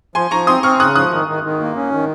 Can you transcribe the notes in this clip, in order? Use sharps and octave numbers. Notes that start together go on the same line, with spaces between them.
F3 G#5 C6
F3 A#5 C#6
C4 C6 D#6
C4 C#6 F6
C#3 D#6 F#6
F3 D#6 F#6
D#3
D#3
D#3
A#3
C#4
D#3